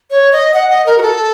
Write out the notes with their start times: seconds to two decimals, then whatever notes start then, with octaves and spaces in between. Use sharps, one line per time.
0.11 C#5
0.32 D#5
0.54 F#5
0.70 D#5
0.86 A#4
0.98 F#4
1.02 A4